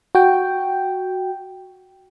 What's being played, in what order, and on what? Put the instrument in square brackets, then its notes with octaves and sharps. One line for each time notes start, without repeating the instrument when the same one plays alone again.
[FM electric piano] F#4 G5